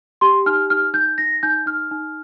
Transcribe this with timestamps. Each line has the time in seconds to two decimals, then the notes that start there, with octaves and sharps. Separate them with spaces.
0.21 G4 C6
0.46 D#4 F6
0.70 D#4 F6
0.94 D#4 G6
1.18 D#4 A#6
1.43 D#4 G6
1.66 D#4 F6
1.91 D#4